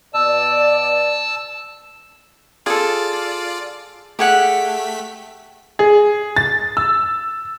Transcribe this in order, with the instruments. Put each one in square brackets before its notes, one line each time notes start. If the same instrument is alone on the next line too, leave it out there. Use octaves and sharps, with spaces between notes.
[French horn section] B2 D5 [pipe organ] A5 E6
[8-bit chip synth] F4 D5 [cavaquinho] G#4 A4
[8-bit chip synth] A3 B6 [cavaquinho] G4 G#4 F#5
[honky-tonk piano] G#4
A6
E6